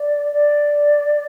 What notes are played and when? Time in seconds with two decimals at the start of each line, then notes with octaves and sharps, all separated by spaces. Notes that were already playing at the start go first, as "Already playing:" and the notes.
Already playing: D5
0.32 D5